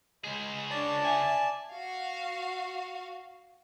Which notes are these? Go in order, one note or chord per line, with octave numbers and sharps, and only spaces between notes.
C#2 G#3 G#4
D4 C#5 D5 A5
E5 G#5
F#4 F5